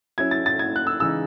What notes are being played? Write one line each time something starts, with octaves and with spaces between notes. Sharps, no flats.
F#3 C#4 E4 G#6
A6
A6
G#6
F#6
E6
C#3 E3 G#3 D#4 E6